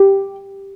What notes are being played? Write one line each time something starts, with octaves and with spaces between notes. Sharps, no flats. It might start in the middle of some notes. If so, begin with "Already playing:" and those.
Already playing: G4